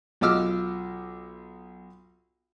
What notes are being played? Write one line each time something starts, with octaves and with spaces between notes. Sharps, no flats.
B1 F4 D#5 D6 E6 F6